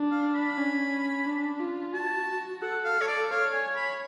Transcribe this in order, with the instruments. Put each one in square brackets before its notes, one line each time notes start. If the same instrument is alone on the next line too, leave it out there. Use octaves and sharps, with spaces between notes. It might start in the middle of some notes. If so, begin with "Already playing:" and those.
Already playing: [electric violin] D4
[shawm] F5
B5
[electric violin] C#4
D4
F4
[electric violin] F#4 [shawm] A5
[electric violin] A4 [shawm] F#5
[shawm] F5
C#5
D5
[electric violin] C#5 [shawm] F5
[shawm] G#5
B5